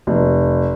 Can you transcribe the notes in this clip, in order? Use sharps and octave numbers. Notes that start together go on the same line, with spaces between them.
F1